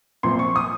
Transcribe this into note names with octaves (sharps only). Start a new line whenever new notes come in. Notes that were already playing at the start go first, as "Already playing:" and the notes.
A#1 A#2 F3 C4 C6
C#6
D#6